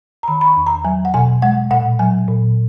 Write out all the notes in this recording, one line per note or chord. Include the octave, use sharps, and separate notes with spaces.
A#5
D#3 B5
B5
C#6
E2
A#5
F#3 G#5
F#5
B2 G#5
G#3 F#5
A#2 F#5
F#3 G#5
A#2